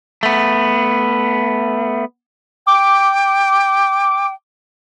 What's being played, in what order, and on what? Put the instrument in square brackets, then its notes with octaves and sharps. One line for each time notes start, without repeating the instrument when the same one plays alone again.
[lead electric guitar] A3 B3
[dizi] G5 [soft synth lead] D6